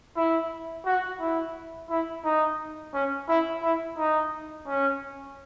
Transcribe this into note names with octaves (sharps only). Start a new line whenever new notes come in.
E4
F#4
E4
E4
D#4
C#4
E4
E4
D#4
C#4